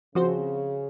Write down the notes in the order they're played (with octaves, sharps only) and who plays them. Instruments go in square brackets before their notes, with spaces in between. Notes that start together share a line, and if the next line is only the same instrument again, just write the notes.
[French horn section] C#3 [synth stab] F3 C4 F#4 C5